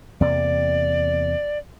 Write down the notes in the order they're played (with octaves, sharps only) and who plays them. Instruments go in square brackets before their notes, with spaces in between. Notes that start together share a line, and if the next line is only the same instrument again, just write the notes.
[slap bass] E2 C3 A#3 [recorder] D5